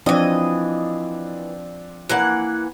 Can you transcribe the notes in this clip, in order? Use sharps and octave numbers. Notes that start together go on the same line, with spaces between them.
E3 F3 C4 D4 D#5
E3 A#3 F#5